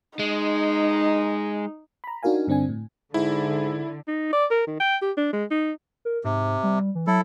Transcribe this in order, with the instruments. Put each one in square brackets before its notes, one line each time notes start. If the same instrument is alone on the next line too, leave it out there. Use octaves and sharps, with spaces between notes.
[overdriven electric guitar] G#3 [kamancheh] D#4
[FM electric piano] A#5 B5
D4 D#4 F#4 A#4 F5 G#5
G2 D3 C4 D4 G#5
A2
[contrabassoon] G#2 [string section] D3 [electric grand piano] E4
[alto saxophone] D#4
D5
A#4
D#3
G5
G4
D4
G#3
D#4
[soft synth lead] A#4
[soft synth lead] G#2 [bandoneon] C3
[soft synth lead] G3
E3
[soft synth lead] F#3 [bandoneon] E4 A4